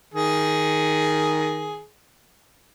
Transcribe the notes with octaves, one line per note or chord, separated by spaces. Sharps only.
D#3 G#4